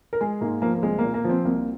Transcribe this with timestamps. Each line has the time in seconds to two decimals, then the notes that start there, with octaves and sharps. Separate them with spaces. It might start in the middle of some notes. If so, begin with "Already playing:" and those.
0.13 A#4
0.21 G#3 G#4
0.41 G#2 A#3
0.62 F3 A#3
0.74 A#3
0.83 C2 G#3
0.99 A#3
1.04 A#2
1.14 A#3
1.25 F3 C4
1.45 C2 A#3